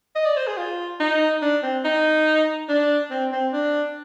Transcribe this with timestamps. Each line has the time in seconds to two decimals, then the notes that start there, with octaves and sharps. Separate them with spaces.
0.15 D#5
0.26 D5
0.36 C5
0.47 G#4
0.58 F4
1.00 D#4
1.42 D4
1.63 C4
1.84 D#4
2.69 D4
3.11 C4
3.32 C4
3.53 D4